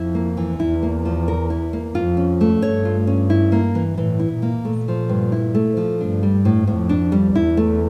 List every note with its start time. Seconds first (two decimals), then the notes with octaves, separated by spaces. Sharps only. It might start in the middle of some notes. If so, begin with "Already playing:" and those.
Already playing: F2 E4
0.15 A#3
0.37 E3
0.60 E2 E4
0.83 A#3
1.05 F3
1.28 A#4
1.50 E4
1.73 A#3
1.95 F2 F4
2.17 C#4
2.41 A3
2.62 G2 C#5
2.85 F4
3.07 C#4
3.30 E4
3.52 A#3
3.75 E3
3.98 A2 E3
4.19 E4
4.32 A#2
4.42 A#3
4.65 A#2 A3
4.88 F3
5.09 G2
5.32 E4
5.55 A3
5.77 F3
6.00 G2 D4
6.23 G3
6.45 A2
6.67 F2 A2
6.89 D4
7.12 G3
7.35 E2 E4
7.57 A3